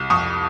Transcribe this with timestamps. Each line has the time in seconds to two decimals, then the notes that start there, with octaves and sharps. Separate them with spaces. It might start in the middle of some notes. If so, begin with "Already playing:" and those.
Already playing: C2
0.10 F2 C#6 D#6